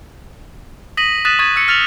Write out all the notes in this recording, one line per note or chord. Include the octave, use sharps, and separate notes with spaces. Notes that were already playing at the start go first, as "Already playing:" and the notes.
D#6 A#6 B6 D#7 F#7
D#6 F#6 A6 B6 D#7 E7
C#6 D#6 G#6 A6 D#7 F#7
E6 F#6 C#7
F6 A6 F7 F#7